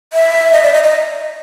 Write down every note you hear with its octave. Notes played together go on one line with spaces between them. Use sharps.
E5
D#5
D5
D#5
D#5